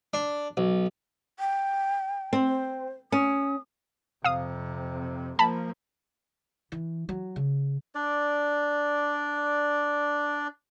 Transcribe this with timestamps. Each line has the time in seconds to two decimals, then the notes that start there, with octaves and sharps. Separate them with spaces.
0.14 D4
0.57 B1
1.39 G5
2.33 C4
2.48 C5
3.12 C#4 D#6
4.24 F2 C3 F5 D#6
5.39 F3 A#3 A5 B5
6.72 E3
7.09 F#3
7.36 C#3
7.95 D4 D5